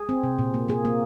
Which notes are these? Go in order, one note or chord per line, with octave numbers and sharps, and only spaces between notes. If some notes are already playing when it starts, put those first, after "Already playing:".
Already playing: G#4
C4
C3
A#2
A#3
A#3 G#4
A#3